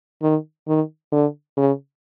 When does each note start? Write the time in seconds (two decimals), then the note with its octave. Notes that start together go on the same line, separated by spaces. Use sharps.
0.22 D#3
0.68 D#3
1.12 D3
1.57 C#3